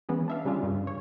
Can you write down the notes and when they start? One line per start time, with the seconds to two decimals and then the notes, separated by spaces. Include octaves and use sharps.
0.09 E3 G#3 B3 C#4
0.28 D4 E5 F5
0.45 C#3 G3 G#3 C#4 D4 F4
0.63 G2 C#3 G3
0.87 C#5